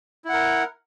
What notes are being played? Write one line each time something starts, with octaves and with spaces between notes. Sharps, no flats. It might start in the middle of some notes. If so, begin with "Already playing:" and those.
E4 A#4 F#5